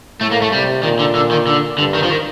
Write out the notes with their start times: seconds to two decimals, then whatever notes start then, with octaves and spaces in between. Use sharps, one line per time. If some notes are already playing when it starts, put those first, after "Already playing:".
0.20 A2 A3
0.32 A#3
0.42 A3
0.52 C3 G3
0.83 A#2 D#3
0.99 D3
1.15 D3
1.31 D#3
1.47 D3
1.78 G2 D3
1.94 D#3
2.03 F3
2.10 D#3